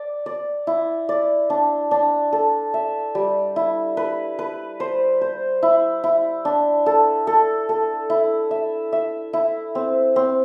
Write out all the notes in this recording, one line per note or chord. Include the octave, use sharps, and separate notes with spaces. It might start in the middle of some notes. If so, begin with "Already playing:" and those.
Already playing: D5
D5
E4
D5
D4
D4
A4
E5
G3
E4
B4
B4
C5
C5
E4
E4
D4
A4
A4
A4
E4
E5
E5
E4
C4
C4